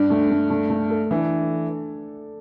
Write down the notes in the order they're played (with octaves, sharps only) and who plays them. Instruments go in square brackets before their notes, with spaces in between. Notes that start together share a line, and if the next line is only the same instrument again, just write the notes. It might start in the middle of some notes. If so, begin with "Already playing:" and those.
Already playing: [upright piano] G2 [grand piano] D4
[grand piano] A3
A3
A3
A3
A4
[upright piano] E3 [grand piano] D4